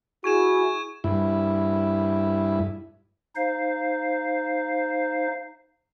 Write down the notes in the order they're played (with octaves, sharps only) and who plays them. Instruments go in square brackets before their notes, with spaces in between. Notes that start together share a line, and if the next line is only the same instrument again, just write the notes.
[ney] E4 [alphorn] F#4 [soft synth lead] G#4 [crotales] C#6 G#6 E7
[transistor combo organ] G2 E4
[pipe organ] D#4 C5 F5